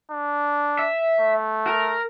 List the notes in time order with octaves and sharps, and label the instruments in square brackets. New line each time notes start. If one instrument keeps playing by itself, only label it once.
[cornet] D4
[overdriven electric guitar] E5
[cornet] A3
[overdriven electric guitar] A#4